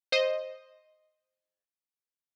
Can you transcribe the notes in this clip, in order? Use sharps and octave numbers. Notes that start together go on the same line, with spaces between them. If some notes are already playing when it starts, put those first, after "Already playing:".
C5 D#5